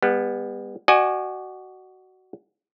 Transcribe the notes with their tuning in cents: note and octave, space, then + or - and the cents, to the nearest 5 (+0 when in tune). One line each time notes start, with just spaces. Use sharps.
G3 +40 B3 +0
F#4 +15 D5 +45 G#5 +0